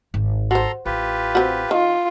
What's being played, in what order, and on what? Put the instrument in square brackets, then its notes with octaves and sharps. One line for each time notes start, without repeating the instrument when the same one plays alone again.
[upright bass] G#1
[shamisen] F#4 C5 [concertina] A4 A#5 C6
[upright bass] A1 [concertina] F4 G4 B4
[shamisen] C4 F#4
[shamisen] D#3 [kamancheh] F4